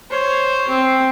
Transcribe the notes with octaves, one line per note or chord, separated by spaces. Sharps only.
C5 C#5
C4